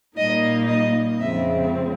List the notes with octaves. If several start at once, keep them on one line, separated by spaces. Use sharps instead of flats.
A#2 G3 A#3 D#4 D#5
D#5
F2 C#3 F3 G#3 C4 E5